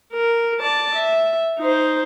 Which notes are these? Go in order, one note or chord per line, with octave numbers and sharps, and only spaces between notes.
A#4
D5 A5
E5
D#4 C5